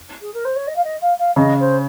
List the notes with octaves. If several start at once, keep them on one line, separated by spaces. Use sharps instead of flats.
G#4
A#4
C5
C#5
D#5
F5
D#5
F5
F5
C#3 D#5
C5